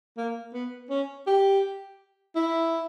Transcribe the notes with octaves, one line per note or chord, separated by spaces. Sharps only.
A#3
B3
C#4
G4
E4